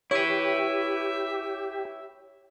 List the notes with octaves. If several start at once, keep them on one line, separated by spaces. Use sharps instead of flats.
E4 G4 B4 C#5 E5